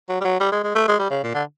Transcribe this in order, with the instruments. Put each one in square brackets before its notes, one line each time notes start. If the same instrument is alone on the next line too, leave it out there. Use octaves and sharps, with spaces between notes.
[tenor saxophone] F#3
G3
F#3
G3
G#3
G#3
A3
G#3
G3
C#3
A#2
D3